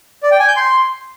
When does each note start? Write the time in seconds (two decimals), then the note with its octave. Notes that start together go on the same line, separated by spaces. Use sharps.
0.23 D5
0.31 G5
0.40 G#5
0.48 G6
0.56 C6